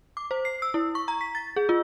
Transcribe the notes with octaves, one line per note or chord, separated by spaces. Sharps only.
D6
C5
C7
E6
E4
C#6
A#5
B6
A6
G#4
F4